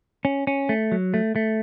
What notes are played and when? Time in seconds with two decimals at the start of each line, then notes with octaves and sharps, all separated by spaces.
0.25 C#4
0.47 C#4
0.69 A3
0.92 F#3
1.14 A3
1.36 A3